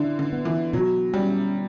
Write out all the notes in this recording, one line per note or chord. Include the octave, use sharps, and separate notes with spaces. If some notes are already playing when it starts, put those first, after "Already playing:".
Already playing: D3 E3 D4
D3
B3
E3
B2 F#3
G3 C#4